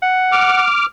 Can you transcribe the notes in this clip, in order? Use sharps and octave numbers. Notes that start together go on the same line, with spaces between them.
F#5
D6 F6